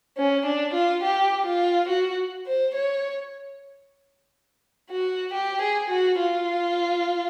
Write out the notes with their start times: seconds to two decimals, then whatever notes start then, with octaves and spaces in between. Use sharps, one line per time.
0.17 C#4
0.46 D4
0.74 F4
1.03 G4
1.46 F4
1.89 F#4
2.47 C5
2.75 C#5
4.90 F#4
5.34 G4
5.62 G#4
5.90 F#4
6.19 F4